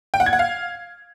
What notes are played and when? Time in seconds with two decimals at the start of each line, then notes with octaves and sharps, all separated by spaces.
0.14 G5
0.20 F#5
0.26 G#6
0.33 F#5
0.39 F5